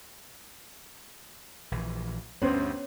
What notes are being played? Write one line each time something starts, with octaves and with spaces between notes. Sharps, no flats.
A#1 E3
D2 G2 B3 C#4 C5 C#5